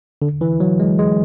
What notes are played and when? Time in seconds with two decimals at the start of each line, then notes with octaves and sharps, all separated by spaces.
0.22 D3
0.41 E3
0.60 F#3
0.80 G#3
0.99 G#3